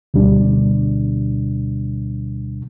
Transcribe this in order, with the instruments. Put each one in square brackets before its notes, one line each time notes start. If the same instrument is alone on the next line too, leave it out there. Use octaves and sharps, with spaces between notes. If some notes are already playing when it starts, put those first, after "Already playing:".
[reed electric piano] D2 B2 G3 D4